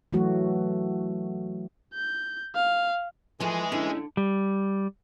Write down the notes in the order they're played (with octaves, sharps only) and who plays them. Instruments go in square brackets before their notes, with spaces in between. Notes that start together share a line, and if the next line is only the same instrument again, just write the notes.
[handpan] E3 F#3 A3 F#4
[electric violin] G6
F5
[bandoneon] E3 [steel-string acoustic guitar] F3 A3 [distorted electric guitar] G#3 G#4
[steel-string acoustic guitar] D3 [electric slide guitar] C#4 E4
[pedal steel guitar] G3